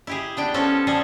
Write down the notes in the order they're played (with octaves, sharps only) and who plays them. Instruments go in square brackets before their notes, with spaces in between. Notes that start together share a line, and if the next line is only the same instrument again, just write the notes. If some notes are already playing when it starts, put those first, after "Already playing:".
[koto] E4 G4 G#4
B3 D4 G5
F3 C#4 A4
F3 G3 G#4 A4